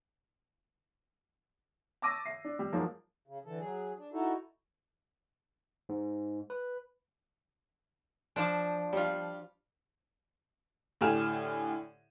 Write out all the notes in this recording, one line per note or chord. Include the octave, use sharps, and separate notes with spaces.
A5 C#6 D6 E6 A#6 D#7
E5 C7
D4
G3
F3 F#3 G#3 A#3 D#4 F4
C#3
D3 E3 A4
F#3 G#4
D4
D#4 E4 F#4 A4
G#2
B4
F3 D4
G3 F4
A2 D3 G4 G#5 F6 E7